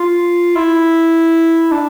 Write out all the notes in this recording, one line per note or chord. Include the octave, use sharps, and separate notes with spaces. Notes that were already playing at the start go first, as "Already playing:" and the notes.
Already playing: F4
E4
D4